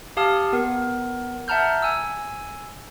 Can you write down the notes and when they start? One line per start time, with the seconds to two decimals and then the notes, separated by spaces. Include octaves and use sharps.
0.17 G4 F5 A5 D#6 F6
0.53 B3 A#4
1.48 E5 F#5 A5 A#5 F6 G6
1.82 G#5 E6